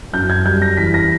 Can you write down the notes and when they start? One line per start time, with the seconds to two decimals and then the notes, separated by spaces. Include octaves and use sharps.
0.13 F#2 G6
0.30 G#6
0.45 G3 G6
0.62 A#6
0.77 E3 B6
0.94 A#6